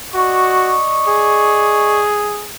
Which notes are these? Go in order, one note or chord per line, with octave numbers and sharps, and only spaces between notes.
F#4 D5 D#5 C#6
G#4